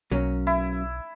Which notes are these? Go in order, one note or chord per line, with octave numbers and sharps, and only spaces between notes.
B1 F#3 A#3 C#4
E4